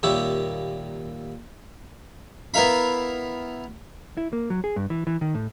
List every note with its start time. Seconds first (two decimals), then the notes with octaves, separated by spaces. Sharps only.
0.03 D#2 A#2 G3 G4 C#5 E5
2.54 B3 E4 A#4 F5 B5
4.17 E4
4.33 A#3
4.50 F#3
4.64 G#4
4.76 G2
4.90 E3
5.07 E3
5.21 D#3
5.35 A2